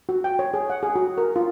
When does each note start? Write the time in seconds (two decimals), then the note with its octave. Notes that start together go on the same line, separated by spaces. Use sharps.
0.09 F#4
0.24 G5
0.39 C#5
0.54 G#4
0.70 F#5
0.83 G#4
0.96 F#4
1.18 A#4
1.36 F4